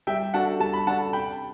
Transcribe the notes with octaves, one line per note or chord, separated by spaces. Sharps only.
G3 E5 G5
D4 F#4 A4 F#5 A5
G3 A5
B5
D4 F#4 A4 F#5 A5
C3 G5 B5